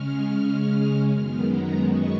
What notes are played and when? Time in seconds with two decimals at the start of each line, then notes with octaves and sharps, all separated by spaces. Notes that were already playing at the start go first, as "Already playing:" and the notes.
Already playing: C#3 G#3 C#4 F6
1.10 F#2 D#3 G#3 B3 F6
1.46 A#5
1.83 C#6